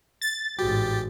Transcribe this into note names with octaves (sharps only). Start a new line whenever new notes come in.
A6
A1 G#2 F#4 G4